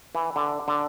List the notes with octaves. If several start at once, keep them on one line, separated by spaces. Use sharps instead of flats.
E3
D3
D3